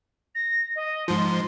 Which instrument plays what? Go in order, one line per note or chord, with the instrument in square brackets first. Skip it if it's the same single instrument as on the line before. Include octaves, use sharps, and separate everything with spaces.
[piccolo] A#6
D#5
[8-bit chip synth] G#2 F3 [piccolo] C6